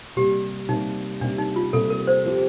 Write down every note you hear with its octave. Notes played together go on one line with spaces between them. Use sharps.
C3 G3 A#3 G4
C3 G3 A#3 D#4
C3 G3 A#3 D4
D#4
F4
C3 G3 A#3 A4
A#4
C5
F3 C4 G4